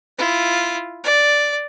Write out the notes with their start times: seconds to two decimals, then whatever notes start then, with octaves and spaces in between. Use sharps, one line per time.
0.18 E4 F4
1.04 D5